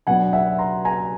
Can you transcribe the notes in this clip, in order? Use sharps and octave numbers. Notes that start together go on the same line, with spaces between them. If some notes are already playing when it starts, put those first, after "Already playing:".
B2 F#3 B3 D4 F#5 G#5
E5 F#5
A#5 C6
G#5 A#5